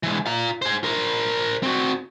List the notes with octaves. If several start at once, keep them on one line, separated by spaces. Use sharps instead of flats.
E3 G#3
F4 A#5
G#4 C5
A#4 C5
C4 F#4